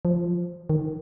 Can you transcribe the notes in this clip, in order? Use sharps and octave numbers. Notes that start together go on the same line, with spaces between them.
F3
D#3